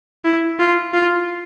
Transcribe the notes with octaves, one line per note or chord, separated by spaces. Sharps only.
E4
F4
F4